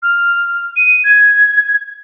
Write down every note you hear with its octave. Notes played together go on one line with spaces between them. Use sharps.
F6
D#7
G#6